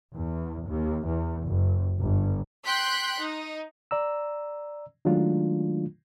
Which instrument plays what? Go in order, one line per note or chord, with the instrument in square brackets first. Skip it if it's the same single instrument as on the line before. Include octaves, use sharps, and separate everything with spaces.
[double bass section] E2
D#2
E2
F#1
G1
[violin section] G5 C6 F#6 G6 B6
D#4
[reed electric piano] D5 A#5 E6
D#3 F#3 G#3 A3 D4 F4